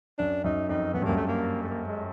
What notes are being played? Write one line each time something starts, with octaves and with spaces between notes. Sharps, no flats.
F#2 D4
F#2 D#4
F2 D#4
F#2 B3
G2
F#2 A#3
A3
A#3
A3
A#3
G#3